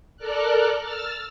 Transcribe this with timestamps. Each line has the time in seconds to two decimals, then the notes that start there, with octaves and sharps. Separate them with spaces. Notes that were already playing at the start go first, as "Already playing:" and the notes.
0.17 A4 A#4 D5 F6 F#6
0.80 E6 F6 A6